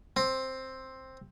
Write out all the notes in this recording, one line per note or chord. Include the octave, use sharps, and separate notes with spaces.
C4